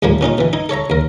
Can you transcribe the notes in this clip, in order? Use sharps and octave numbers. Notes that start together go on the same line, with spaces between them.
D#2 A2 F3 G3 A#3
A#2 C#4 D#4 F4
B2 E3
D#4 E4
A4 C#5 E5 A#5
D#2 A#4